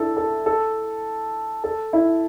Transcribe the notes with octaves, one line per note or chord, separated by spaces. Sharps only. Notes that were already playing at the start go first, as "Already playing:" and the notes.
Already playing: D4 E4 A4
A4
A4
A4
E4